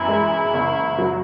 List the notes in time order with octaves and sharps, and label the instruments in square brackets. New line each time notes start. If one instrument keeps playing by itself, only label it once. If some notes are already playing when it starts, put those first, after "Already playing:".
Already playing: [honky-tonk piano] F#2 E3 [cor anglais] E4
[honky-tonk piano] G#3
F#1
F#3